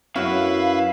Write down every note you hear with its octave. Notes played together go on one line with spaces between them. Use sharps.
F#2 C#4 E4 F#4 B4 F5